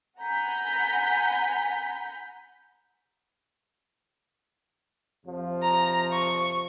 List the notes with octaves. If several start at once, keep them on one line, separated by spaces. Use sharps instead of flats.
F#5 G#5 A#5 B5 G6 B6
F2 C3 F3
A#5
C#6